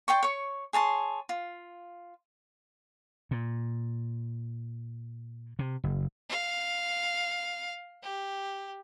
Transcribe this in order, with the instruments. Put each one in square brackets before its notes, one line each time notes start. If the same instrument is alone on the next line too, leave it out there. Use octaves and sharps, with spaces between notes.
[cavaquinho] D5 G5 C6 C#6
C#5 C#6
G#4 C#5 A5 C6
F4
[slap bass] A#2
C3
F#1
[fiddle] F5
G4